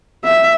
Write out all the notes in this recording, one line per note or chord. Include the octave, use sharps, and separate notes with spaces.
E5